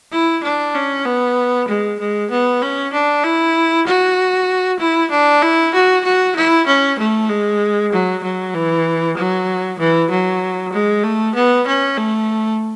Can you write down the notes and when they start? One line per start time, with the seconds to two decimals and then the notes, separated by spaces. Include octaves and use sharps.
0.12 E4
0.44 D4
0.75 C#4
1.06 B3
1.68 G#3
2.00 G#3
2.31 B3
2.62 C#4
2.93 D4
3.24 E4
3.87 F#4
4.80 E4
5.11 D4
5.43 E4
5.74 F#4
6.05 F#4
6.36 E4
6.67 C#4
6.99 A3
7.29 G#3
7.93 F#3
8.23 F#3
8.55 E3
9.17 F#3
9.79 E3
10.10 F#3
10.73 G#3
11.04 A3
11.35 B3
11.67 C#4
11.98 A3